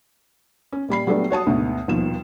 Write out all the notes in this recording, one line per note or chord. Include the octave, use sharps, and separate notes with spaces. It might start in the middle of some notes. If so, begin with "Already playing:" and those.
C#4
A#2 G3 B5 C7
F#3 G3 A3 B3 D4
F#4 C#5 A5 D#6
D2 G#2 B2
D#1 D#2 B2 F3 E7